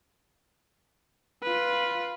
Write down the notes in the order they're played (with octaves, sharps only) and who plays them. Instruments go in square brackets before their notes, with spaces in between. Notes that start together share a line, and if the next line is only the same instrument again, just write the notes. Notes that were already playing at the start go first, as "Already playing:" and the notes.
[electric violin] F4 B4